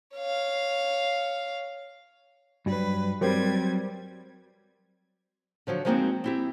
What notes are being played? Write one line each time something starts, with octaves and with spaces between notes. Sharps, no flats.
C#5 F5
G2 F#3 G3 B4
F#3 G3 C4 G4 A#4 C5 G#6
D3 F3 F#3 F#4
F3 G#3 A#3 C4 D#4 F#4
C4 E4 G4